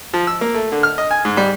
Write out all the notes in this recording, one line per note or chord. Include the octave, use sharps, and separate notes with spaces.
F3
E6
A#3
A3
D3
F6
D#5
G#5
G#2
G3